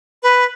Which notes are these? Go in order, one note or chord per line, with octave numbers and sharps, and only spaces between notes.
B4